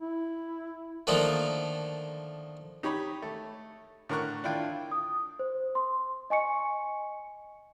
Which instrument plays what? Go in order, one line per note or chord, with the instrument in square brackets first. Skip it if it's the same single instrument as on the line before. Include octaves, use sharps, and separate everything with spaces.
[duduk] E4
[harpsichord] D3 D#3 F3 A3 A#3 D#4
[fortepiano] D#4 G4 C#5 B5
A3
A2 D3 A#4 A#5 C#6 F#6
D4 E4 F4 G5
[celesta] D#6
C5
C6
D#5 G#5 C#6 C#7